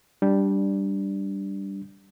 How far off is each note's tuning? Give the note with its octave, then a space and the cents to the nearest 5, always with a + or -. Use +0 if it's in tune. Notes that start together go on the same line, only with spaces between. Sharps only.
G3 +0 D4 -5